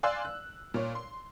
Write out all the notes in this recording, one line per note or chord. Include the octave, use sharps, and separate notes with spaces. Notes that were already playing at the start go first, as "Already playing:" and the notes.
D5 F5 G#5 C6 E6 F#6
F#6
A#2 C#5
C6